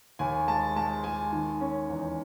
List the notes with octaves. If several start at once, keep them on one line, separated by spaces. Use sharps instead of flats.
D#2 G#5
G#3 A5
G#3 A5
G#3 G#5
D#3
C#4
E2